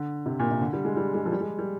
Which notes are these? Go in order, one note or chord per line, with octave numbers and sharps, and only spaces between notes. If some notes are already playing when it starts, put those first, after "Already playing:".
Already playing: D3
C3
A#2
C3
D3
G3
G#3
G3
G#3
F3
G3
G#3
G3